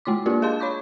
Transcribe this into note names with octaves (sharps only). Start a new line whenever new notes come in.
G#3 A3 E4 C6 D6
A#3 D4 F4 G4 A#4
G#4 D#5 F5 A5 C6 G6
C#5 B5 C#6 D6 G6